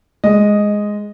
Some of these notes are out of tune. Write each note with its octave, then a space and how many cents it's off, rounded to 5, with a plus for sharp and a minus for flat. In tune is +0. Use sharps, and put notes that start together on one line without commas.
G#3 +0 D#5 +0